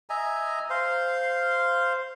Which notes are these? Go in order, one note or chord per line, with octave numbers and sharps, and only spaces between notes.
D#5 E5 G#5 A#5
C5 F5